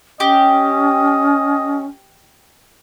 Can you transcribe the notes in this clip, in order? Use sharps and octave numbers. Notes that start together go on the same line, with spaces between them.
C#4 G4 D#5